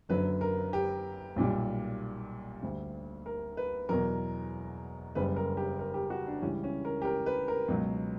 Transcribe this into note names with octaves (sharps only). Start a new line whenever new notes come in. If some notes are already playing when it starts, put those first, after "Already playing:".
F#1 F#2 D3 F#3 B4
A#4
G4
B1 A#2 G3
D2 D3 G3
A#4
B4
E2 B2 F#3 A#4
F#1 F#2 C#3 G3 B4
A#4
G4
A#4
G4
F#4
D4
C#2 C#3 E3 G3 C#4
C#4
A#4
G4
A#4
B4
A#4
C#2 B2 F#3